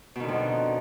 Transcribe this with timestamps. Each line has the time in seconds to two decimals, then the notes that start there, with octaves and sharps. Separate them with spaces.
0.16 B2
0.20 D#3
0.24 D3
0.28 F2